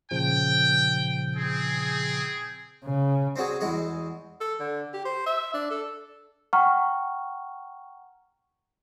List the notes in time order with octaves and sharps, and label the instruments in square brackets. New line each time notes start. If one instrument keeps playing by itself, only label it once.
[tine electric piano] A#2 C#3 F3 [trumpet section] G5
[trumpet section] C4 G#4
[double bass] C#3
[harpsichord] C4 D4 F#4 G#4
E2 G#3 F#4 G#4
[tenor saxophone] A4
D3
G4
C5
E5
D4
A4
[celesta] F#5 G5 A#5 C#6 F6